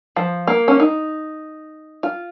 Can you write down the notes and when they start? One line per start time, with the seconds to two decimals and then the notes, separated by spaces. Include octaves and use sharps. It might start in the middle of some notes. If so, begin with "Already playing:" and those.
0.16 F3
0.47 A#3
0.68 C#4
0.80 D#4
2.03 F4